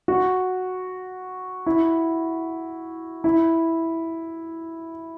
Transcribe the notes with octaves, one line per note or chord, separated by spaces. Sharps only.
F#4
E4
E4